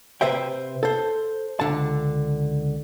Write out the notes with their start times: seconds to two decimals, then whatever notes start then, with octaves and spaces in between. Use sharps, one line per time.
0.21 C3 B4 C5 E5 G5
0.83 A4 C5
1.60 C#2 D3 A5